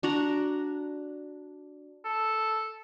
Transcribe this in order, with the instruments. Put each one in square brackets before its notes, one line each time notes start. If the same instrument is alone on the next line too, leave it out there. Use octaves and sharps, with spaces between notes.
[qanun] D4 F#4 A#5
[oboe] A4